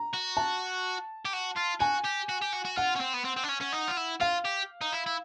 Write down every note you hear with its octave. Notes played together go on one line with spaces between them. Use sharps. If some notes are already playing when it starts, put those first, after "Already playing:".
Already playing: A#5
F#4
A5
G4
F#4
F4
F#4 G#5
G4
F#4
G4
F#4
F#4
F4 F#5
C#4
C4
B3
C4
C4
D4
C#4
C#4
D#4
F4
E4
F4 F5
G4
D#4
E4
E4